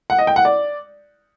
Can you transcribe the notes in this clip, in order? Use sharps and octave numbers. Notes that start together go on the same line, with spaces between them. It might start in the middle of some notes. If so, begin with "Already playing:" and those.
F#5
D#5
G5
F#5
D5